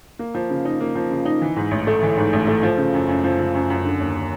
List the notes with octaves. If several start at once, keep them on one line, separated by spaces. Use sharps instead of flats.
A#3
F3
C#3
D#4
A#3
F3
C#3
D#4
E3
G#2
A1
A3
E3
G#2
A1
A3
F3
C#3
F#2
F#2
F3
C#3
F#2
F#2
D3
D#2